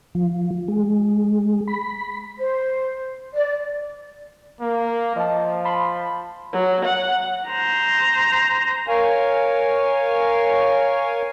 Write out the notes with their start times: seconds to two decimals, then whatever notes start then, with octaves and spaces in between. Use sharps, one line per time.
0.15 F3
0.68 G#3
1.67 B5
2.38 C5
3.35 D5
4.61 A#3
5.16 F3 D#5 A5
5.65 A5 B5 C6
6.52 F#3
6.84 F#5
7.49 C5 A#5
8.88 A#4 C#5 F5 G#5